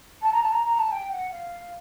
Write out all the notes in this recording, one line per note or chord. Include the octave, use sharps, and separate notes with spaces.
A5
A#5
A5
A#5
A#5
A5
G5
F#5
F5